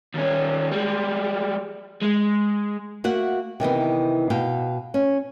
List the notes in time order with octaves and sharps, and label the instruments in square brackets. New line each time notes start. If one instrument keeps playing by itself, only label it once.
[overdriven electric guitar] D#2 C#4
G3 G#3
G#3
[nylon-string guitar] A3 A#3 F#4 E5 F#5
C3 D#3 E3 B3
B2 F5 G5
C#4